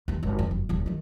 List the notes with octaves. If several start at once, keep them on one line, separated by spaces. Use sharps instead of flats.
D#2 E3
G#1
F2
F#1
D#1 E2
D#3 A3